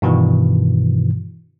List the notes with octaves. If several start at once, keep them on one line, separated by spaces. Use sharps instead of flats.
G2 B2 D#3 E3